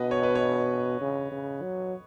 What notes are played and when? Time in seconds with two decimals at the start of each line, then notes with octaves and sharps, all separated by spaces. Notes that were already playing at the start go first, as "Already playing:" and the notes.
Already playing: B2 B4 D#5 F#5
0.11 C#5
0.23 B4
0.35 C#5
1.01 C#3
1.32 C#3
1.62 F#3